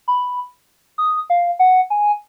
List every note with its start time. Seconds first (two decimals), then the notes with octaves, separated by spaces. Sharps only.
0.08 B5
0.98 D#6
1.30 F5
1.59 F#5
1.90 G#5